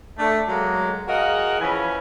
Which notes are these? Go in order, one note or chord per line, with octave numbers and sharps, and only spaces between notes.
A3 D4
F#3 G#3 A#3
F#4 G#4 A#4 D#5 F5 F#5
E3 F3 C#4 G#5 B5